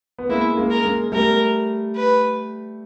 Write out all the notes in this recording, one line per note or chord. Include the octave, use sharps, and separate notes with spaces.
B3
G#3 A#3 E4
G#3 A#3
A#4
G#3 A#3
G3 A3 A#4
B4